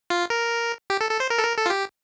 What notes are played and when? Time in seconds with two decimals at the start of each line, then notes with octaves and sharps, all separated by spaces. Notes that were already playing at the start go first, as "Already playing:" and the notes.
0.10 F4
0.30 A#4
0.90 G4
1.01 A4
1.11 A4
1.20 C5
1.30 A#4
1.38 A4
1.44 A#4
1.57 A4
1.66 F4
1.70 G4